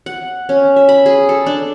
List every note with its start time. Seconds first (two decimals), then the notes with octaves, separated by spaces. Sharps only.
0.06 F#5
0.49 C#4
0.76 E5
0.89 B5
1.06 G#4
1.29 A4
1.46 D4